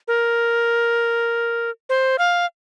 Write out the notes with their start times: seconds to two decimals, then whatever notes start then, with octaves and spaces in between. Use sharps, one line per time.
0.08 A#4
1.89 C5
2.19 F5